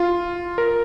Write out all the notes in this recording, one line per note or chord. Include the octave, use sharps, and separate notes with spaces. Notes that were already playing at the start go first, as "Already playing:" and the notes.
Already playing: F4
A#4